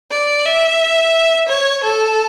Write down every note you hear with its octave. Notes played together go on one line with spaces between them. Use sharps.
D5
E5
C#5
A4